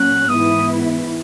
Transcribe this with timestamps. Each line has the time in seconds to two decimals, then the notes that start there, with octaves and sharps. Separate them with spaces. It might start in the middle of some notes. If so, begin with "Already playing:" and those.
Already playing: A#2 F#3 C#4 F#6
0.29 G#2 E3 B3 E4 D#6